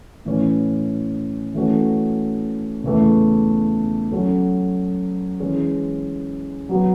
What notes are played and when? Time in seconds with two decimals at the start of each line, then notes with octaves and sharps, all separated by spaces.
0.25 A2 E3 A3 C#4
1.54 E3 A3 C#4 F#4 A4
2.83 E2 C#3 E3 A3
4.12 F#3 C#4 F#4 A4
5.40 E3 G#3 C#4 G#4
6.69 F#3 B3 F#4